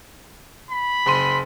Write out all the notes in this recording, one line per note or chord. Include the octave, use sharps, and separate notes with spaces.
B5
F#1 C6 D#7